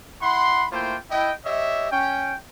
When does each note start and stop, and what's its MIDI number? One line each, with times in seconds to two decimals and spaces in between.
0.22 0.67 64
0.22 0.67 78
0.22 0.67 83
0.22 0.67 84
0.72 0.98 57
0.72 0.98 58
0.72 0.98 64
0.72 0.98 65
0.72 0.98 72
0.72 0.98 79
1.11 1.33 64
1.11 1.33 75
1.11 1.33 79
1.45 1.91 67
1.45 1.91 73
1.45 1.91 75
1.45 1.91 76
1.92 2.35 61
1.92 2.35 79